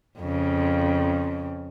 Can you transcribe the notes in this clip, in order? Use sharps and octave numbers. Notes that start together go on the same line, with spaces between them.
F2 C#3